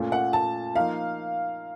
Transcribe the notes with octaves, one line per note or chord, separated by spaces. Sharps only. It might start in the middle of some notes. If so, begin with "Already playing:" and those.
Already playing: A#2 A3 C#4 F4
F#5
A5
F3 A#3 D#4 F5